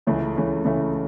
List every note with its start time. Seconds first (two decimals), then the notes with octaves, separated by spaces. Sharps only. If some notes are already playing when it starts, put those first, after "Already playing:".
0.07 C#2 C#3 E3 A3
0.36 C#2 C#3 E3 A3
0.65 C#2 C#3 E3 A3